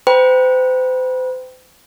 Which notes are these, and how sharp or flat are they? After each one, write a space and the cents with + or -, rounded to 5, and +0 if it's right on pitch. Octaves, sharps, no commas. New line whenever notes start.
C5 -40 G5 +0 B5 -35